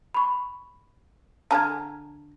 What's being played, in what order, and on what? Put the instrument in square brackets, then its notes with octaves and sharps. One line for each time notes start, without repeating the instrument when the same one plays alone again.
[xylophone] B5 C#6
[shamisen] D3 G#4 A#5 [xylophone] A5 F6 G#6